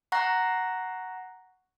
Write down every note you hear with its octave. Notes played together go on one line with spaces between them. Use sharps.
F#5 A#5 C#6 F#6 A#6